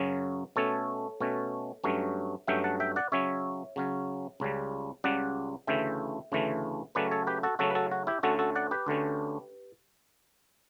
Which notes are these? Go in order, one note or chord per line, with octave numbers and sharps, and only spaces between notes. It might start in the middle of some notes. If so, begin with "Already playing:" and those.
Already playing: F#2 C#3 F#3 C#4
B2 A3 C#4 A4 C#5
B2 A3 C#4
G2 F#3 A3 C#4
G2 F#3 A3 C#4 E5 G5
F#5 A5
E5 G5
D5 F#5
C#3 F#3 C#4 C#5 E5
C#3 F#3 C#4
C#2 C#3 G3
C#2 C#3 G3 D5 F#5
D2 C#3 E3 A3 E5 G5
D2 C#3 E3 A3
C#3 F#3 A3 C#4 B4 D5
A4 C#5
G4 B4
F#4 A4
C#3 F#3 A3 C#4 F#4 A4
B4
F#4 A4
F#4
E4 G4
D2 D3 A3 C#4 F#4 A4
F#4 A4
D5 F#5
G4 B4
D2 D3 A3 C#4